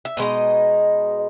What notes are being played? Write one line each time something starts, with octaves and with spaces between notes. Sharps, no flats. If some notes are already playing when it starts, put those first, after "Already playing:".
E5
B2 G#3 D#4 D#5